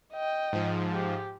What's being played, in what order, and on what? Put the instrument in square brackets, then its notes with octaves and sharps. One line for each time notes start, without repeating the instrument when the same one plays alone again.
[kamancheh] D#5 G5
[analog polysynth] G#2 F3
[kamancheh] G4